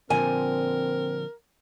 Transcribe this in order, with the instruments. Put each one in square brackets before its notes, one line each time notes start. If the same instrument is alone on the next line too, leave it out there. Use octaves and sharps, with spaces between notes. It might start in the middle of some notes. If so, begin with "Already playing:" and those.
[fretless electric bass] A#2 D3 F3 [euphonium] C4 [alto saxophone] A#4 [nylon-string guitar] G#5